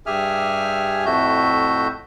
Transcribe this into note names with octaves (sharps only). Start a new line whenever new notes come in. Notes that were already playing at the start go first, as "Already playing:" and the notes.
G2 G4 G#4 E5 G#5 F6
F2 A2 A3 F#4 E5 G6